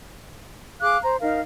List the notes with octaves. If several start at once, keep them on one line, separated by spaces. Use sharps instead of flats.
G#4 F5 D6 F#6
C5 A#5
D#4 A#4 F5